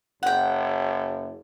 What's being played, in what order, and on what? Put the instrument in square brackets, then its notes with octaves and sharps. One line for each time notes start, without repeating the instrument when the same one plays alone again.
[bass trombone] F#1 [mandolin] F#5 G5